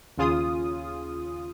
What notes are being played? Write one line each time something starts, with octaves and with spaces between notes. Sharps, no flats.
D#2 C#3 F4 G#4 D#6